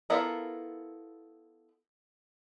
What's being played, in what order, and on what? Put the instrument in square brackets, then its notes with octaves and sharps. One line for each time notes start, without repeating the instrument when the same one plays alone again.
[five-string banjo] B3 E4 F4 A4 A#4